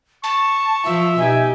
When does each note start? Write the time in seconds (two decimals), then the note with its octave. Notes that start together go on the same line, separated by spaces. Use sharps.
0.24 A5 C#6
0.85 F3 E5
1.19 B2 D#4 G4 G#5